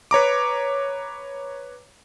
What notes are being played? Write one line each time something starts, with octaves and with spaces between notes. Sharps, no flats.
B4 C#5 A#5 D6